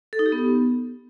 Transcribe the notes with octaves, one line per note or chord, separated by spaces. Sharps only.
A4
D#4
G4
B3